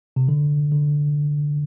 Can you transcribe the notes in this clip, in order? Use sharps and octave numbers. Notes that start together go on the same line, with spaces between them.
C3
D3
D3